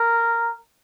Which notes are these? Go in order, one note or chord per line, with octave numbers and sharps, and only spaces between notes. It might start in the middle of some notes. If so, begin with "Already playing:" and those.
Already playing: A#4